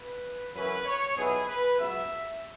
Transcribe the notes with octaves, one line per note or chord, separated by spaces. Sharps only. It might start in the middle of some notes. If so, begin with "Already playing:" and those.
Already playing: B4
F#2 C#3 E3 C#4 E4 B4
C#5
B1 B2 B3 E4 G#4
B4
C#2 C#3 F#3 B3 E5